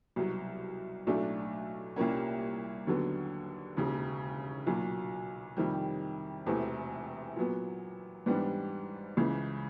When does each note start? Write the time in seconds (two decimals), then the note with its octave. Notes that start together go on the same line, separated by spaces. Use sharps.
0.16 C2 B2 F#3
1.07 B1 A2 F#3 A3 D4
1.96 C2 A#2 G3 A#3 C#4
2.87 D#2 D3 F#3 B3
3.77 E1 D#2 C#3
4.67 B1 A#2 F#3
5.57 F2 C3 D#3 G3
6.46 E1 E2 C3 E3 A3
7.36 A#2 F#3 B3
8.26 G#2 E3 G3 B3 D4
9.17 C#2 C#3 E3